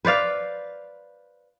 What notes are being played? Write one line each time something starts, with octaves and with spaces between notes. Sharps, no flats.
B4 C5 D5 F5